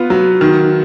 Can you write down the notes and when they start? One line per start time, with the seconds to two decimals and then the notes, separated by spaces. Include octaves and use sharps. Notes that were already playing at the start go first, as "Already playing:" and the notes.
Already playing: B3 F4
0.10 F#3
0.41 D#3